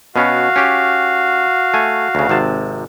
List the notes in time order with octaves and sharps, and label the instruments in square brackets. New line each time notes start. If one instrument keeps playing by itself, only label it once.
[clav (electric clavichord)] B2 B3 C#4 [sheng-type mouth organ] F#4 F5
[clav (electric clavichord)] C#4 G4
A3 G#5
D2 C#3
G#1 C3 A5